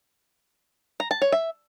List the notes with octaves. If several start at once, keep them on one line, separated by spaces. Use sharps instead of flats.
A#5
A5
C#5
E5